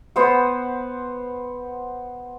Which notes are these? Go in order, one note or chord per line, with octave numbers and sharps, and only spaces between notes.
B3 C5 F#5